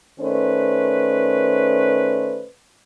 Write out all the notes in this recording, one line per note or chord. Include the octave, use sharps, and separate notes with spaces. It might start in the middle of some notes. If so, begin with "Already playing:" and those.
D#3 A3 C#4 B4 C5 D5